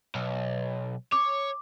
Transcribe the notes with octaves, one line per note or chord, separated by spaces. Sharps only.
B1
C#5 D6